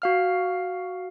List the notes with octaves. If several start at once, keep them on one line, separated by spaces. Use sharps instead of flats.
F#4 F5 F6